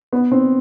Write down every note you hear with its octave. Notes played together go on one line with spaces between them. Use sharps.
B3
C4